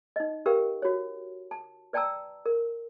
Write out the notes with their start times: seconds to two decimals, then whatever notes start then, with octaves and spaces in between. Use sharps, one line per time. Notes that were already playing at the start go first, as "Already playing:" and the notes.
0.16 D#4 D#5
0.46 G4 A#4 B4 F5 G5
0.82 F#4 C#5
1.51 A5
1.93 B4 D5 G5 A5 A#5 E6
2.46 A#4